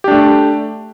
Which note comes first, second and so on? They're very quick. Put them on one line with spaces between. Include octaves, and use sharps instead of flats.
G4 D4 A3